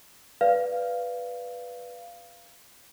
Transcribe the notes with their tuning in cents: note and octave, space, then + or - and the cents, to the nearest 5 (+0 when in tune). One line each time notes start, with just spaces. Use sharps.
B4 +0 D5 +0 F5 -10